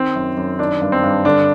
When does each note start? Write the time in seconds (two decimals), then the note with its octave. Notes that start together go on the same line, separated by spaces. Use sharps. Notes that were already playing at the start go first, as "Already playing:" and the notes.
Already playing: D#3 C4
0.15 F#2
0.37 F#2
0.59 D#3 D4
0.81 G2
0.92 C4
1.03 G2
1.25 D3 D4